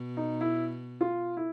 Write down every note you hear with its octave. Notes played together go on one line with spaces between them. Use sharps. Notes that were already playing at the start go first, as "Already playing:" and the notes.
Already playing: B2
D#4
E4
F4
E4